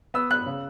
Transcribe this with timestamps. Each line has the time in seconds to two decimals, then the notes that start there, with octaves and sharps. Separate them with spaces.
0.14 B3 E6
0.31 B3 F#6
0.46 C#3